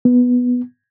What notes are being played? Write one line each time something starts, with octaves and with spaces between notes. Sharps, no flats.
B3